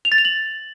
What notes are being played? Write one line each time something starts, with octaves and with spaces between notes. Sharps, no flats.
F7
A6
F7
F#7